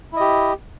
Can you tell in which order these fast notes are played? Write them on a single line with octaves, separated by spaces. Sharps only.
E4 D#5 G4